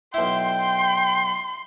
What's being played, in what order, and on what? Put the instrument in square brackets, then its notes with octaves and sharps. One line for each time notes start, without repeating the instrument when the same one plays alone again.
[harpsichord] B1 E4 [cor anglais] G5 [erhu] C6
[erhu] C6